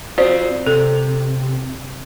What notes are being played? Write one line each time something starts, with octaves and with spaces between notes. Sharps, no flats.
C4 F4 F#4 C5 D5
C3 A4